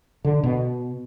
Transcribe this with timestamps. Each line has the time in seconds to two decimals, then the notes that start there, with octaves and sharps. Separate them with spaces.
0.25 D3
0.43 B2